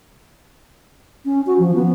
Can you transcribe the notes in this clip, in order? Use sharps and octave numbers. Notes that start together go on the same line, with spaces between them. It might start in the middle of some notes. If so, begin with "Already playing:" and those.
C#4
F#4
F3
B3